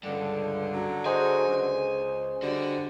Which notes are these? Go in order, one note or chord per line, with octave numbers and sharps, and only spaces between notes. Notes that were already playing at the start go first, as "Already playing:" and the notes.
C#2 G2 D3
F#3
G#4 C5 D#5 G#5
C#2
D3 G3 F#4